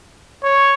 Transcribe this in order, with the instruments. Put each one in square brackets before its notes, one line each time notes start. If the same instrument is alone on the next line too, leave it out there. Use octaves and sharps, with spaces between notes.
[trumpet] C#5